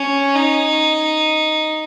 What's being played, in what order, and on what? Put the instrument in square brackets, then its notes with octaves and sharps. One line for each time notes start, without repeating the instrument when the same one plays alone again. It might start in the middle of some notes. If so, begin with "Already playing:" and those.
Already playing: [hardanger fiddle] C#4
D#4